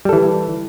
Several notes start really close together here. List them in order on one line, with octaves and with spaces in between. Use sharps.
G3 A4 E3